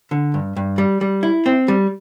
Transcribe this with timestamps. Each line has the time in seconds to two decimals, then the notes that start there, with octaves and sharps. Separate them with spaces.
0.11 D3
0.34 G2
0.56 G2
0.78 G3
1.01 G3
1.23 E4
1.46 C4
1.68 G3